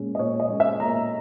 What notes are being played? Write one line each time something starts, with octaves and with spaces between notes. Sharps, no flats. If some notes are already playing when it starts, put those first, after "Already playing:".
Already playing: A#2 G#3 C#4
D#5
A#2 C#5
D#5
G#3 C#4
E5
A#2 A#5